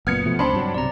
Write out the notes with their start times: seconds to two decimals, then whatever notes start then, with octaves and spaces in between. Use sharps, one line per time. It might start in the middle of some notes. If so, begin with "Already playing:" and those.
0.07 F#1 A#2 B3 F6 G#6 C#7
0.25 B2 F3 A3
0.39 C#2 C4 D4 A5 B5 C6
0.54 G2 F#3
0.74 B1 C3 D5 A#5